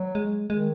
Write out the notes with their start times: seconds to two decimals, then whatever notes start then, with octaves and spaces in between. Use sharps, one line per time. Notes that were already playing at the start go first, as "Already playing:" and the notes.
Already playing: F#3
0.15 G#3
0.50 D#3 G#3